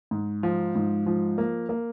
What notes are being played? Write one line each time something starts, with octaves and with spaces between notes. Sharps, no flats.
G#2
F3
G#2
F3
A#3
A#3